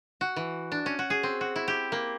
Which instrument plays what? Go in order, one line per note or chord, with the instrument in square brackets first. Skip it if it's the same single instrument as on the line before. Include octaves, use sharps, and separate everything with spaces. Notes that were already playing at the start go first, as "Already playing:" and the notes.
[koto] F#4
E3
D4
C#4
F#4
G#4
C4
F#4
E4
G4
A#3